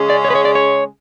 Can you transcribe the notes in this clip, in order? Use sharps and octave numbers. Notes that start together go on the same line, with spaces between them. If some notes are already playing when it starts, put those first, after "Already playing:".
Already playing: C#3 G#3 C#4 G#4
D5
C#5
B4
C#5
D5
C#5